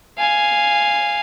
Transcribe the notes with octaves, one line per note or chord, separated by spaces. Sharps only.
F5 G#5